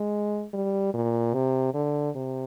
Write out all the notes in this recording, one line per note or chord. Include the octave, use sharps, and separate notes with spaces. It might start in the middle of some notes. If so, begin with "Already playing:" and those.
Already playing: G#3
G3
A#2
C3
D3
C3